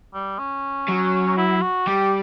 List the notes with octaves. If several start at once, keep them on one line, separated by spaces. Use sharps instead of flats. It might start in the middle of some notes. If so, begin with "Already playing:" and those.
G3
C#4
F#3
E4
F#4
G3 G4